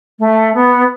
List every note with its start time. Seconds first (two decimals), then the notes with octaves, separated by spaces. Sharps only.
0.19 A3
0.54 B3